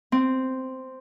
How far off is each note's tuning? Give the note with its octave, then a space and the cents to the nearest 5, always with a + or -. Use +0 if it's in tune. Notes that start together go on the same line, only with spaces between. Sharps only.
C4 -5